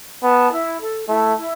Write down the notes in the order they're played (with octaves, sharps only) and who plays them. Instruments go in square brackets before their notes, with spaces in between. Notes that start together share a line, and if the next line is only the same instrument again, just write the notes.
[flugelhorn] B3 [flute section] A5
[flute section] E4
A4
[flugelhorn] A3 [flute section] E4
[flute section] E4